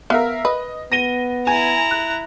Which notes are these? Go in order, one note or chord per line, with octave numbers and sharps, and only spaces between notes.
B3 A#4 E5 F5
B4 D#5
B3 A#6 D#7 G7
E4 G#5 A#5
F#6